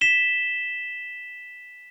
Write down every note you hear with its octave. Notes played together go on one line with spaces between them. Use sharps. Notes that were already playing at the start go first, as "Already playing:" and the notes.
B6 E7 G7